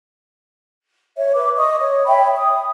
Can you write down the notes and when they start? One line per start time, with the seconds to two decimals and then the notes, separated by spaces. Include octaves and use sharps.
1.17 C#5 E5
1.35 B4 D6
1.58 D#5 C#6 D#6
1.81 C#5
2.06 C#5 E5 G5 B5
2.37 D#6